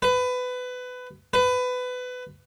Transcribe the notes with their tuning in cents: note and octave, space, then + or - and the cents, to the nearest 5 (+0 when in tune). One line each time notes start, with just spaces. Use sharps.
B4 +20
B4 +20